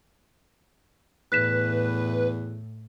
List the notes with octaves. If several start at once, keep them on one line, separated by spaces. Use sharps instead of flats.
E2 A2 B4 F#6 B6 E7